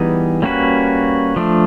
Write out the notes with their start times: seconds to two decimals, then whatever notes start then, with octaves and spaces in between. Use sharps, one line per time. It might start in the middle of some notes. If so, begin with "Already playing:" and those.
Already playing: E3 G3 B3 D#4 G#4
0.42 G3 A#3 C#4 F#4 B4
1.36 F3 A3 D4